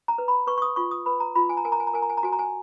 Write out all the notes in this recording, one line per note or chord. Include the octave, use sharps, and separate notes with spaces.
A#5
B4
B5
B4 C#6
C#6
D#6
F4 C#6
D#6
B4 B5
A#5
F4 B5
G#5
A#5
A#4 G#5
A#5
G#5
A#5
A#4 G#5
A#5
G#5
A#5
F#4 G#5
A#5
G#5